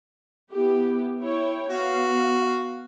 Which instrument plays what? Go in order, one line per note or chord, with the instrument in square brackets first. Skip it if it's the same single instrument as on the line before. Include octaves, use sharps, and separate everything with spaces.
[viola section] B3 E4 G4
E4 C#5 G5
[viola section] B3 F5 [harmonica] F#4